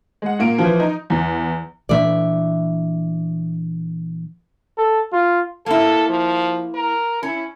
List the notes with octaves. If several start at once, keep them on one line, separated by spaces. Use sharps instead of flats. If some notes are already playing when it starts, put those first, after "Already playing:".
G#3 F#5
A#2 A#3 D7
E3 F3
D#4
E2
A#2 E3 D4 D5 E5
A4
F4
A#3 E4 A4
F3
A#4
C#4 E4